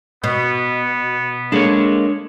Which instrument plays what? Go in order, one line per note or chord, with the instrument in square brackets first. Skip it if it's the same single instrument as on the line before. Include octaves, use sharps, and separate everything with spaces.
[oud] B2 [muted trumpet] B3
[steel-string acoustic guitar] G#3 A#3 [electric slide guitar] D4 A4 C#5